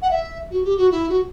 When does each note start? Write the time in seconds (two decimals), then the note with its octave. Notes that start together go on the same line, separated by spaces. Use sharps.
0.02 F#5
0.11 E5
0.51 F#4
0.64 G4
0.77 F#4
0.91 E4
1.09 F#4